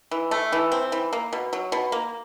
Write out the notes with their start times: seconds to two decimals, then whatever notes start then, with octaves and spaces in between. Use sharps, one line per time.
0.11 E3
0.31 A3
0.52 E3
0.72 C4
0.92 E3
1.13 A#3
1.33 B2
1.53 F#3
1.72 B2
1.92 A#3